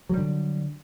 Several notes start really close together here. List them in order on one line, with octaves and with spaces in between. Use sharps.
F#3 G3 D3